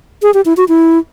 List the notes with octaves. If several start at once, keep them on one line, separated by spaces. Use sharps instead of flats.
G#4
G4
E4
F#4
E4